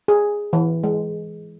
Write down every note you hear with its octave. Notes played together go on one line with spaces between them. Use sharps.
G#4
E3
G#3